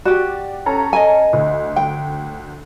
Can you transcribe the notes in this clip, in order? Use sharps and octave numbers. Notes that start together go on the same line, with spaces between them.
F#4 G4 D5
C#4 A4 A#5
D#5 G#5
D2
G5